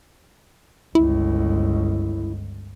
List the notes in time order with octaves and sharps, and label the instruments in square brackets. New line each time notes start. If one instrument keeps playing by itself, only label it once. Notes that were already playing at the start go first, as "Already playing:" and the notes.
[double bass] G1 C#2 [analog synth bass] E4